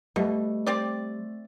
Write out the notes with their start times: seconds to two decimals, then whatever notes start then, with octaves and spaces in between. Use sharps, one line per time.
0.16 B2 G3 A3
0.67 C4 G4 D5